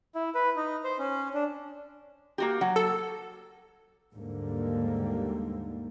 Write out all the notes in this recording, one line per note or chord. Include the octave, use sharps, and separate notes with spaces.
E4
B4
D#4
C5
C#4
D4
A#3 F#4 G4
F#3 F#5 G5
A4 C#5
D#2 G#2 D3 G3 A#3